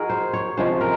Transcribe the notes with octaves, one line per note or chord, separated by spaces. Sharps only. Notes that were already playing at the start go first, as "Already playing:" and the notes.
Already playing: D#4 F#4 G#4 A#4
C5
C#5
C3 F3 G#3 C#4 C5
A#4